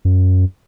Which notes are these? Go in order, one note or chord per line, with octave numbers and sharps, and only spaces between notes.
F#2